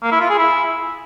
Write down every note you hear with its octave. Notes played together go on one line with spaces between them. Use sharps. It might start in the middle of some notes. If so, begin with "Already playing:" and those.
A#3
E4
F4
G#4
E4